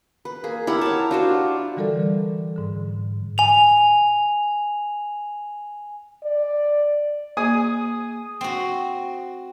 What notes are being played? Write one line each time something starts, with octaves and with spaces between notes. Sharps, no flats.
B4
A#3 G#4
E4 G4 A#4 F#5
C#5 A5
D4 F4 F#4 C5
D3 E3 G3 A4 A#4 D5
G#2 D3
G#5 F7
D5
A#3 G#4 G#5 D#6
C4 F#4